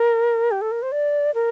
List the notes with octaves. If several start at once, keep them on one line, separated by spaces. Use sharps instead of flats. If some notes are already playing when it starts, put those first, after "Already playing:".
Already playing: A#4
G4
A4
A#4
C5
D5
A#4